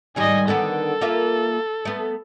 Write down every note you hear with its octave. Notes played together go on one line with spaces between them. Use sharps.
G#2 D#3 G3 D#5 G#5
D3 D#3 B3 A4
A#3 F4 E5
A3 B3